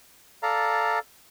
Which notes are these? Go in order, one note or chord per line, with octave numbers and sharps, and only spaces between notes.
A4 D5 F5 A#5